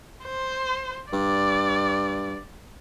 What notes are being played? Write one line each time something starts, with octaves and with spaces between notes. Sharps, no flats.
C5
G2 D5